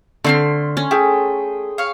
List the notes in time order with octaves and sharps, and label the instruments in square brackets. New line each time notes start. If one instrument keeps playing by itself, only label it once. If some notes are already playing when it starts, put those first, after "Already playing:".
[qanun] D3 [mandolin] A3 C4 F6 [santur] C6
[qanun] C#4
[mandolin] A3 [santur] G#4 G5
[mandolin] C#5 F5